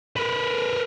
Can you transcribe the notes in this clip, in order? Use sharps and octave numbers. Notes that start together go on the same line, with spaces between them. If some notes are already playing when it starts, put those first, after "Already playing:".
A#4 B4